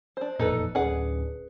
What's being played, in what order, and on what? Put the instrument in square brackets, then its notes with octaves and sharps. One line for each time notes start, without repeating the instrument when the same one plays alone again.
[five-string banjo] D4 C5
[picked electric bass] E1 F2 A#2 [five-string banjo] D#4 A4 B4
[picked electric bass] D1 C#4 D4 [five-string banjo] G#4 B4 F#5